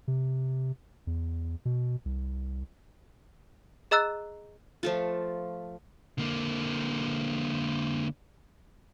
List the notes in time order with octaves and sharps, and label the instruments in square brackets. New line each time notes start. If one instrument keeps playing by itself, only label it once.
[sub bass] C3
E2
B2
C2
[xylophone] G#4 D#5 A#5 E6 F#6 A6
[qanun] F3 A3 F4
[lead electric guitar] D3 A#3